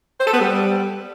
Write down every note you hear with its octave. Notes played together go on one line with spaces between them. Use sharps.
C5
A4
B3
G3